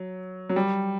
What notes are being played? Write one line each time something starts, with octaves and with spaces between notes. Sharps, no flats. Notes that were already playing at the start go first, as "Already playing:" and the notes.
Already playing: F#3
F#3
G3